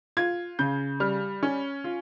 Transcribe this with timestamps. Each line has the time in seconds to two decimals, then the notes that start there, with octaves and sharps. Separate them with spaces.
0.17 F4 G#6
0.59 C#3 G6
1.00 G3 F6
1.43 C#4
1.84 F4